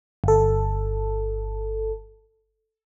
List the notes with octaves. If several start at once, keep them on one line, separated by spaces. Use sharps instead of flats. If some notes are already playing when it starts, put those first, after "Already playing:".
G1 A4